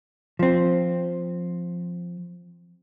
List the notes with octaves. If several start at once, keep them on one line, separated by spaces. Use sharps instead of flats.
F3 C4